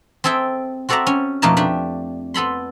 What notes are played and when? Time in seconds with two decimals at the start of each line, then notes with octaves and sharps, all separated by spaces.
0.24 C4 G#4 A4 E5 G5
0.89 C4 F#4 A4 D5 E5 A#5
1.07 C#4
1.42 F2 B2 A3 A#3 D#4 A5
1.57 A3 D4 G4
2.34 B3 A4 B5 C6